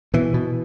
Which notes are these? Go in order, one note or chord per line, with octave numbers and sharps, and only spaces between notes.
B2 E3
B2